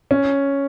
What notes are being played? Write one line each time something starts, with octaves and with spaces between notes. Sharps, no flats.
C#4